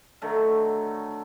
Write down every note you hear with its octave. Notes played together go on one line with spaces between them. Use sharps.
D3 D#3 F#3 A3